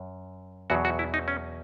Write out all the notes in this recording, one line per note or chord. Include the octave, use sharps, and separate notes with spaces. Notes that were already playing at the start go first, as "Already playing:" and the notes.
Already playing: F#2
E2 B2 F#3 F#4
F#4
E4
D#4
C#4